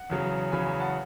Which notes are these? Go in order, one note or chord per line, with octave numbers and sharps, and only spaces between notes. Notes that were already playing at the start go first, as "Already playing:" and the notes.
Already playing: F#5
E2 C#3 F#3
E2 C#3 F#3 G#5 B5
G#5 B5
F#5 A5